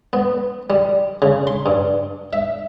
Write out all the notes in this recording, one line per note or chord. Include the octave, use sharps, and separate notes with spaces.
B3
G3
C#3
C6
G2
E5